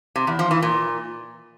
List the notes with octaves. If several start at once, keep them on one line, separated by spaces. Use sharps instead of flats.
C3
E2
F3
E3
A#2